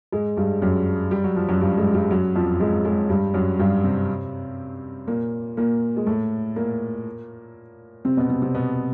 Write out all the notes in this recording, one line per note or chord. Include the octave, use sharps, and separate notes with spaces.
G#2 G#3
G2 G3
F#2 F#3
G3
F#3
F3
F#2 F#3
G2 G3
G#2 G#3
G2 G3
F#2 F#3
F2 F3
G#2 G#3
G#2 G#3
G2 G3
F#2 F#3
G2 G3
C3 C4
A#2 A#3
A#2 A#3
G#3
A2 A3
A#2 A#3
C3 C4
B2 B3
C3 C4
C3 C4
B2 B3